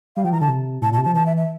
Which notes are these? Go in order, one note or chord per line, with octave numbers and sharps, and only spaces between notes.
G3 F5
F3 G5
E3 A#5
D3 A5
C3
A2 A5
A#2 A5
C3
F3 A5
E3 A5
E5
E5